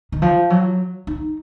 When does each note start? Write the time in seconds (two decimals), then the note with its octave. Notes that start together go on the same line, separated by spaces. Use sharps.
0.12 D#3
0.22 F3
0.50 F#3
1.07 D#4